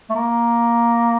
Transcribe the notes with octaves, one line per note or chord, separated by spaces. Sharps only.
A3
A#3